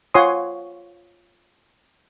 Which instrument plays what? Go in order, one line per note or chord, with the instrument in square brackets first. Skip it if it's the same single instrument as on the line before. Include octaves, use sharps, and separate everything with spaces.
[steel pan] F4 C#5 F#5 G#5 C6 D#6